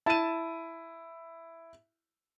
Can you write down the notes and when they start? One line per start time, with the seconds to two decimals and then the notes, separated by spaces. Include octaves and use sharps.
0.06 E4 A5 D#7